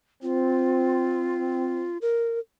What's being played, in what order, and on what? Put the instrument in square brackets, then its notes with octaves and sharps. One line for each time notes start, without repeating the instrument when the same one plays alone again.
[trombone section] C4 [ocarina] F4
[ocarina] A#4